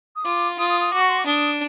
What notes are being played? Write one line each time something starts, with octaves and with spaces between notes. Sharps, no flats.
D#6
F4 D6
F4 D#6
D#6
D#6
F#4 D6
C#6
C6
D6
D4 D#6